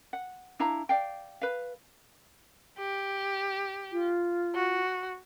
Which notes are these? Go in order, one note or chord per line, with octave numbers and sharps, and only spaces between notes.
F#5
D4 E4 F5 A#5
D5 F5 G5
B4 F5
G4
F4
F#4